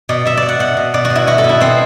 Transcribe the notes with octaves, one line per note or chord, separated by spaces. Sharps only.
B2 D5
B2 E5
B2 D5
F#5
B2 F#5
B2
B2 D5
F#4
B2
E4
B2 F#4
A4
B2
E4
B2 C4